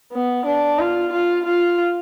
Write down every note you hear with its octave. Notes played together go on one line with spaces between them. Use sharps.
B3
D4
F4
F4
F4